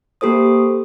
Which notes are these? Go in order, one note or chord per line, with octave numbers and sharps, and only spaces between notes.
A#3 G4 A4 C5 D#6